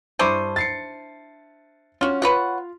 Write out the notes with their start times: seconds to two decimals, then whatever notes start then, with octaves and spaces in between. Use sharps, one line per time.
0.19 G2 D4 E4 C5 C#6 D#7
0.56 A6 C7 C#7
2.01 C#4 F4 F#4
2.22 F4 B4 C#5 F#5